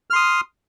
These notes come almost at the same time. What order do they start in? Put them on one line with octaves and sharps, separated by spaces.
F6 C6 D#6